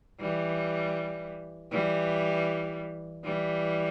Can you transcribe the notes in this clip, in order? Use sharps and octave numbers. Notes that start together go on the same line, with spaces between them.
E3 G3
E3 G3
E3 G3